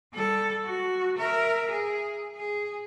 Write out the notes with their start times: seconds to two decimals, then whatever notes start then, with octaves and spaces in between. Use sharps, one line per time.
0.13 G3 A4
0.64 F#4
1.17 A#4 E5
1.70 G#4
2.36 G#4